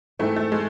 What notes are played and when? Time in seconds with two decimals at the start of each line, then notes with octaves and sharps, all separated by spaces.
0.19 G#2 E3 A3 C4 E4
0.36 A3
0.52 G#3